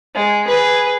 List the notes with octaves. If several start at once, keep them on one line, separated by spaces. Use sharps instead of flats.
G#3
G#4 B4